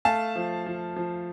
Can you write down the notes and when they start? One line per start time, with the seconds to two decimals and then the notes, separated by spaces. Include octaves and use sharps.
0.05 A3 F5 A5
0.36 F3
0.66 F3
0.96 F3